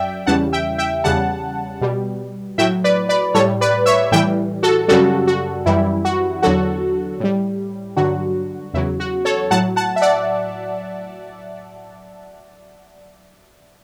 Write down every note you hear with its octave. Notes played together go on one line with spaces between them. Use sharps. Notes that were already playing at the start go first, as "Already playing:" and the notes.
Already playing: F#2 F#3 D5 E5 G5
E2 C#3 E3 G3 F#5 A5
E5 G5
E5 G5
E2 C#3 G3 F#5 A5
B2 G3
A2 F#3 E5 G5
B4 D5
B4 D5
A2 G3 A4 C#5
B4 D5
C#5 E5
A2 E3 G3 E5 G5
F#4 A4
F#2 C#3 G3 F#4 A4
F#4
F#2 E3 G3 E4
F#4
E2 D3 F#3 F#4 A4
A2 G3
G2 D3 F#3 F#4
E2 C#3 F#3 E4
F#4
A4 C#5
A2 F#3 F#5 A5
F#5 A5
E5
D5 F#5